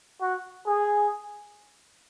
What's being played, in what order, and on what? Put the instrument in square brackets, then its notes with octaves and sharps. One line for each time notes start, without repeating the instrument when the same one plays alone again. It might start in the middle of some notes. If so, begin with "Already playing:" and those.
[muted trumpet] F#4
G#4